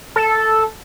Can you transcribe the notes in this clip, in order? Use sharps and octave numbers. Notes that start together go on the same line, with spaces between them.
A4